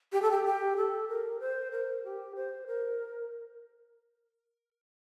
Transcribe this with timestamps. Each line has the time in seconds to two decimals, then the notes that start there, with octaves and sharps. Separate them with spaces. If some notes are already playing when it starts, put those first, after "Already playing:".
0.12 G4
0.22 A4
0.31 G4
0.45 G4
0.77 A4
1.08 A#4
1.40 C5
1.71 A#4
2.04 G4
2.36 C5
2.67 A#4